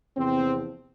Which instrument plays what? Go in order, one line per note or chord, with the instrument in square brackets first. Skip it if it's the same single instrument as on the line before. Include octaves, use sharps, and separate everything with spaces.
[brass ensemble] E2 C3 F3 C4